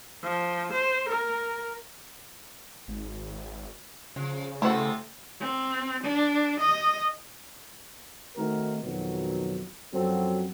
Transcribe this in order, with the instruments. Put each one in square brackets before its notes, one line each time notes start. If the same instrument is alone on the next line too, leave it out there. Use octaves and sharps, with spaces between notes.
[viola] F3
C5
A#4
[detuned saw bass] G#1
[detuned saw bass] C#3 [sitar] F3
[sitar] C3 B3 A4 [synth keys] A3 C5 [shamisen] E4 F#4
[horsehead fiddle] C4
D4
D#5
[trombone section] D#3 A3 C4 D#4 F#4 A#4
F2 B2 D#3 F#3
F#2 F3 F#3 C4 F#4 A4